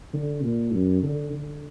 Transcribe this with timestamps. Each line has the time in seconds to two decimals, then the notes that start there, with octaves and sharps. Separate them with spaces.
0.13 D3
0.43 A#2
0.73 F#2
1.03 D3
1.33 D3